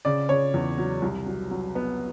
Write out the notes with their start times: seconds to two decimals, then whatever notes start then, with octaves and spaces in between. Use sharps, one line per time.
0.05 C#3 D5
0.29 C#3 C#5
0.54 E2
0.78 F#3
1.02 C2
1.26 F#3
1.51 F#3
1.75 B3